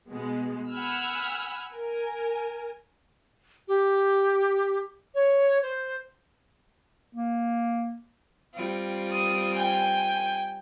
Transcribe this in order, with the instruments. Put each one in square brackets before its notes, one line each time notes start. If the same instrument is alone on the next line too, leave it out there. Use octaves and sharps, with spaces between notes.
[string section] B2 G#3
F#5 G#5 B5 E6 F6
A#4 G#5
[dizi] G4
C#5
C5
[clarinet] A#3
[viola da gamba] G3 C4 F4
[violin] D#6
G5 G#5